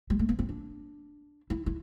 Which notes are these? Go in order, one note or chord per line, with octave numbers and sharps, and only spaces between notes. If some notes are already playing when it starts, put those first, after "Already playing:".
G3
A3
B3
C4
D4
E4
E4